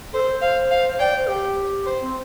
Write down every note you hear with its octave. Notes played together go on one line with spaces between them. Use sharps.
A4 C5
A4
C5
F5
F5
D5 G5
C5
G4 G5
C5
C4